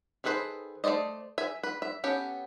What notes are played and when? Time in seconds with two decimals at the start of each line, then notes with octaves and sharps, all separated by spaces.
0.24 D#3 G#4 A4 B4 C5
0.84 A3 C#4 C5 D5 D#5
1.38 E5 G#5
1.63 B4
1.82 E5
2.04 B3 C#4 G4 A4